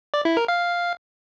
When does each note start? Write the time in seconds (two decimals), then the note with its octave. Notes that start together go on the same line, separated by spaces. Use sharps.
0.14 D5
0.25 E4
0.37 A#4
0.48 F5